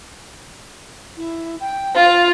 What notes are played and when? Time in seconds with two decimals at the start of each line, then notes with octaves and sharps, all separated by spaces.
1.17 E4
1.60 G5
1.96 F4 F5